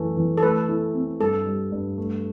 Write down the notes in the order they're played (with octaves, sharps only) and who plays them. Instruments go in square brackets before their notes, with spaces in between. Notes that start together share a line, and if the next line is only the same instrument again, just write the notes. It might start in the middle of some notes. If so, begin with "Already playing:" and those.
Already playing: [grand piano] F#2 E3 A3
E3
[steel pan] A4
[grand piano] A3 [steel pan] B4
[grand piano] E4
C4
[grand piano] G2 [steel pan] A4
[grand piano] G3
G2
A3